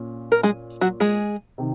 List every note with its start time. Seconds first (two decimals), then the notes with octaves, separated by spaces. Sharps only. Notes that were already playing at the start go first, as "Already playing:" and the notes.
Already playing: A#2 C#4
0.32 A#4
0.43 G#3 G#4
0.81 F#3 F#4
1.00 G#3 G#4
1.58 C3 D#3